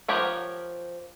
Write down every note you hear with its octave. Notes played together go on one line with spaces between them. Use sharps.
F3 G4 A#4 C#5 F#5